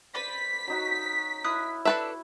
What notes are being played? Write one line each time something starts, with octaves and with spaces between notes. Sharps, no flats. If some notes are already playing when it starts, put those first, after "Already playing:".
B4 C5 D5 B6
F#3 D#4 F#4
E4 A#4 D#6 F#6
D4 A4 B4 E5